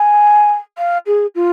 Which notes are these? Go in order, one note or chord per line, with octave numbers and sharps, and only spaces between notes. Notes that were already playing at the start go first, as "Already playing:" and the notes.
Already playing: G#5
F5
G#4
F4